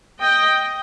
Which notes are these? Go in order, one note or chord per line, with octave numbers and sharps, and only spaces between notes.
D#5 G5